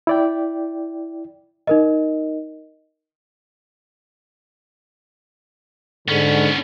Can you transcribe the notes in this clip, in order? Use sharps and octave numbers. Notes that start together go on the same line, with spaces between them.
E4 D5 G5
D#4 A#4 D#5
G#2 D3 B3 C#4